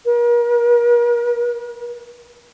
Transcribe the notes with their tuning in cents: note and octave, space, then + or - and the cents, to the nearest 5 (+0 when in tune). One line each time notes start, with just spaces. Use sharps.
A#4 +40